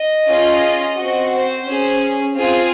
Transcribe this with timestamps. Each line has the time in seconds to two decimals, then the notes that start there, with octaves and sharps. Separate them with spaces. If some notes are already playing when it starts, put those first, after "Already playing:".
Already playing: D#5
0.27 C#4 F4 G#4
0.97 C4 F#4
1.32 C5
1.66 C#4 G#4
2.36 C4 F4 G#4